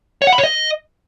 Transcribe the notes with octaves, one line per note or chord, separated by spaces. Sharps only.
C#5
F#5
B5
C#5
D#5